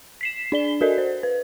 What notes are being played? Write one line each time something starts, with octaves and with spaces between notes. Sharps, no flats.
B6 C7 E7
D4 D5 G7
F#4 A4 A#4 D5 D#5
C5
B4